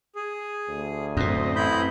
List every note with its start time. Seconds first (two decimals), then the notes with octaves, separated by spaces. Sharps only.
0.16 G#4
0.68 D2
1.17 F#2 A2 C4 D#5
1.56 A1 E4 B5 G6